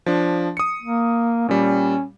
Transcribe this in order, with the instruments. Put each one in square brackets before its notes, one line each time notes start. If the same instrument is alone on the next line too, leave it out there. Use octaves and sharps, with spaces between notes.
[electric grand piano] F3 D4
D#6 C#7
[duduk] A#3
[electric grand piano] A#2 G3 [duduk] C#4